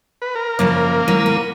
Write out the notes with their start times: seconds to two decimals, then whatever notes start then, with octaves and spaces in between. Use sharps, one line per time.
0.22 B4
0.35 A#4
0.59 F#2 C#3 F3 A#3
1.08 D#3 F#3 G#3 E4
1.26 B3